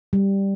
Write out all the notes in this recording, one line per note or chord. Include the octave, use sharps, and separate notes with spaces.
G3